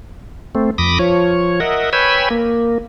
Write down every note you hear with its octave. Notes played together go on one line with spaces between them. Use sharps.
A3 C4
F2 B5 D6 D#6 A#6
F3 C#5
A#4 D#5 E5 F#5
B4 C#5 G5 G#5 B5 E6
A#3